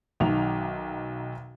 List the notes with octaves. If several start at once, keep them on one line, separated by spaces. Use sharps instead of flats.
B1 D#3 F#3 E5 F7